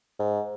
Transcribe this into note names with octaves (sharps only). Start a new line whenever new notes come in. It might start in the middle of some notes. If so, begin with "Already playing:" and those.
G#2